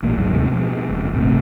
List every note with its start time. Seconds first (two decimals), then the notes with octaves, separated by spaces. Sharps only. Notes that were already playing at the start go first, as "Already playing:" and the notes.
0.02 A1 A#2 G#3
0.16 G#1 D2 F#3 G#3
0.33 D#2 A2 C3 D#3
0.51 B2 F3 G3 G#3
0.89 F#1 F2
1.13 D#1 G#1 C3 A3